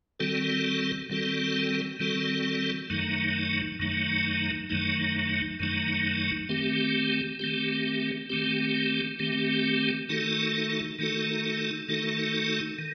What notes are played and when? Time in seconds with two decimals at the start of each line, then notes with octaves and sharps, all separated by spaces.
0.20 D#3 G3 C4 F#4 A4
1.10 D#3 G3 C4 F#4 A4
2.00 D#3 G3 C4 F#4 A4
2.90 F#2 D#3 F#3 A3 D#4
3.79 F#2 D#3 F#3 A3 D#4
4.70 F#2 D#3 F#3 A3 D#4
5.59 F#2 D#3 F#3 A3 D#4
6.49 D#3 A3 C4 G4
7.39 D#3 A3 C4 G4
8.30 D#3 A3 C4 G4
9.19 D#3 A3 C4 G4
10.09 D#3 A3 D#4 F#4 A4
10.99 D#3 A3 D#4 F#4 A4
11.88 D#3 A3 D#4 F#4 A4
12.79 D#3